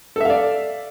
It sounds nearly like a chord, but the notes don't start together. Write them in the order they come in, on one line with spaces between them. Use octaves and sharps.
A4 E5 F5 D5